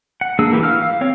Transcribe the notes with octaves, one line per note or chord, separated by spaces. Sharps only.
F#5
A#3 D4 G#4 E6
E3 A#3 E4 G4 B4
F5 E6 F6
F5
C4 C#5 F5